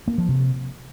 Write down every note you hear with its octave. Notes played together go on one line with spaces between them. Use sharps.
A#3
F3
C3